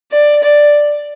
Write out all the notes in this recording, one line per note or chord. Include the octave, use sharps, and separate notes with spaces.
D5
D5